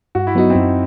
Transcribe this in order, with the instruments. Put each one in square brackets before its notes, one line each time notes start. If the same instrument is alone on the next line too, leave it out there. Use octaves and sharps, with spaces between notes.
[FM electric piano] G2 [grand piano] F#4
[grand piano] E4
[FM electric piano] F#3 B3 F#4 [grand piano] D#4
[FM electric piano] F#2 [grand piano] C4 E4